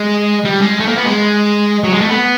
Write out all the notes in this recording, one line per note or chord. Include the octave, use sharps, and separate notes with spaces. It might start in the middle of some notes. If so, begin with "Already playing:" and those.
Already playing: G#3
G3
G#3
A3
A#3
B3
G#3
F#3
G#3
A3
B3